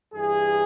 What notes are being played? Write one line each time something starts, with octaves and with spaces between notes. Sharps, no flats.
G2 E3 G#4